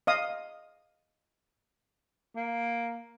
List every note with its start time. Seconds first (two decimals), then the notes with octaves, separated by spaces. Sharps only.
0.07 D#5 F5 D#6
2.36 A#3